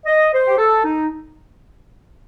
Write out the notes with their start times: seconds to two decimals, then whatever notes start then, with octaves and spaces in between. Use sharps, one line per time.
0.06 D#5
0.32 C5
0.47 G4
0.58 A4
0.84 D#4